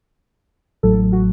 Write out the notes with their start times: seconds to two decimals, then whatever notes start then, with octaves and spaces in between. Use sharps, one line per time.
0.83 A1 A2 F#3 A4
1.12 F#4